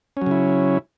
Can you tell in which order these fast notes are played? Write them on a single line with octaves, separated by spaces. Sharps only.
C#4 F#3 C#3 E4